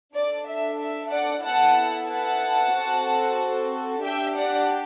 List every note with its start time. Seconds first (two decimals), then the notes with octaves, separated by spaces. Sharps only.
0.15 D4 A4 D5
0.47 E5
0.80 E5
1.12 D5 F#5
1.44 B3 E4 A4 F#5 A5
2.09 F#5 A5
2.75 C4 F#4 A4
4.04 D4 G4 E5 G5
4.37 D5 F#5